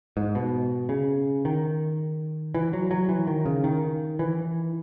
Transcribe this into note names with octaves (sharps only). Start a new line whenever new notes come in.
G#2
B2
C#3
D#3
E3
F#3
F#3
E3
D#3
C#3
D#3
E3